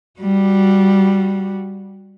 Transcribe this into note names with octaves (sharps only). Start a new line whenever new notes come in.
G3 F#4